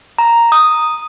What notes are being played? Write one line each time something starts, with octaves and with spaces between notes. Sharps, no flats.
A#5
D#6